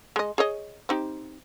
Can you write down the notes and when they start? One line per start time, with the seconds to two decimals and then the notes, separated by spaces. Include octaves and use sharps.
0.16 G#3 D#5
0.38 G#4 C#5 D#5
0.89 C4 D#4 G4